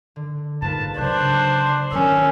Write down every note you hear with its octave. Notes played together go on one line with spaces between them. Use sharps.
D3
G#2 A#3 F4 B4 A5
C#3 F#3 D4 C5 F#6
G#2 D#3 E3 F#3 C#4 A#4 E6